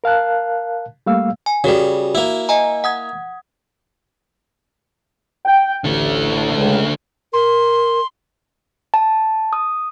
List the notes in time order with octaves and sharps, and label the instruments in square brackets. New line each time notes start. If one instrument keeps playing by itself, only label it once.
[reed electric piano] A#4 F5 A5 F#6
G3 A3 A#3 F5 E6
[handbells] G#5
[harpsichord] C#3 G3 [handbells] F#4 A#4
[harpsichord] A#3 E4
[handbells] D#5 G#5 A#5
F#5 D#6 G#6
[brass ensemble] G5
[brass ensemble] A1 [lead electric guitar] D3 A3
[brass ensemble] C#2
[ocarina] A#4 [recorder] C6
[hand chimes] A5
D#6